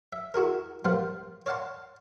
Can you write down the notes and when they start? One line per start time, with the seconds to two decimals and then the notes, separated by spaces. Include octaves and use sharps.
0.13 E5
0.34 E4 F#4 G#4 A#4
0.85 A#2 F3 G3 B3 F4 F5
1.46 C#5 D5 F5 F#5 A5 C6